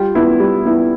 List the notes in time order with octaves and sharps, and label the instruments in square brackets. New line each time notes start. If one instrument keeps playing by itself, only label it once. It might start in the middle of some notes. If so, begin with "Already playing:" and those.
Already playing: [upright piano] G3 [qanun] F4 G4
[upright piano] B3 E4
G3
B3 E4